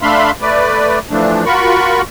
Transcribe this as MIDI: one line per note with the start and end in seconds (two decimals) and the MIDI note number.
0.02 0.31 57
0.02 0.31 62
0.02 0.31 76
0.02 0.31 77
0.02 0.31 83
0.02 0.31 84
0.42 0.99 57
0.42 0.99 71
0.42 0.99 74
1.11 1.44 52
1.11 1.44 53
1.11 1.44 57
1.11 1.44 62
1.46 2.02 65
1.46 2.02 66
1.46 2.02 70
1.46 2.02 83
1.46 2.02 85